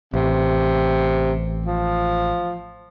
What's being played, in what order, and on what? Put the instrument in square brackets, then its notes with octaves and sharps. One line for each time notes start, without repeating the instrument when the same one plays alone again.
[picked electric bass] A1 [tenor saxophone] C3
[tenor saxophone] F3